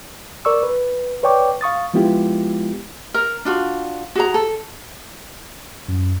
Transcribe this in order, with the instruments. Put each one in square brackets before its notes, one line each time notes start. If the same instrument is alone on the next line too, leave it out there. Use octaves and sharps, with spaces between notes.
[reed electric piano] A#4 D5 C#6 E6
B4
B4 C#5 D5 G5 C#6 D6
F5 C#6 D#6 A6
F3 G#3 B3 E4 F4 G4
[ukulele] A#4
D4 F4 F#4
F#4 G#4 A#5
A4
[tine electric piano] F#2